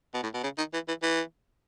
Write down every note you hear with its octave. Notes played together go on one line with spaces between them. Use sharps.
B2
A2
B2
C#3
D#3
E3
E3
E3